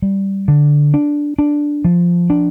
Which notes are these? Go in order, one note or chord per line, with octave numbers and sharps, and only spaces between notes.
G3
D3
D4
D4
F3
D4